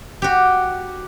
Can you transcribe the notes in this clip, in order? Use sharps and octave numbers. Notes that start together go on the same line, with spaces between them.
F#4 G4